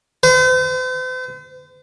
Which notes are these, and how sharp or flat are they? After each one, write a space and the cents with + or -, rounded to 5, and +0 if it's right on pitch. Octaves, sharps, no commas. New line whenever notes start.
C5 -45